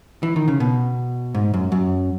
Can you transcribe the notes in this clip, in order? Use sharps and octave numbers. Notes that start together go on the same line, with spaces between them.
E3
D#3
C#3
B2
G#2
F#2
F#2